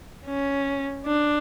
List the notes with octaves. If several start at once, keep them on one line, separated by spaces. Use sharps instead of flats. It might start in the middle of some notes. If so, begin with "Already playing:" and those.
C#4
D4